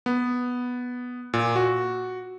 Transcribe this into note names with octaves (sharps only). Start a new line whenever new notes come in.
B3
A#2
F#4